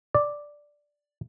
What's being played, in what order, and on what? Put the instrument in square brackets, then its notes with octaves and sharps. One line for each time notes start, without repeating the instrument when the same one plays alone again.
[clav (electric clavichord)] D5